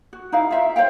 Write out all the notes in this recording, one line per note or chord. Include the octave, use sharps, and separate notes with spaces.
F#4
D#4 E4 F5
F4 E5 F5
C5 C#5 F5 G5